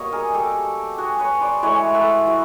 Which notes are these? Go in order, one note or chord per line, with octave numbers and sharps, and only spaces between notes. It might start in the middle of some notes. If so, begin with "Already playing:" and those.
Already playing: B2 G3 A#3 C#5 D#5
G#4 A#4
G4 A4
F#4 G#4
B4 C#5
C5 D5
A2 E3 G#3 B4 C#5
A4 B4
E4 F#4